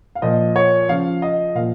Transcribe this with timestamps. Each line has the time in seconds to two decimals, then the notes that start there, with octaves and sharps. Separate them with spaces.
0.15 F5
0.22 A#2 F3 D#5
0.56 C#5
0.89 C#3 F3 F5
1.22 D#5
1.55 A#2 F3 F5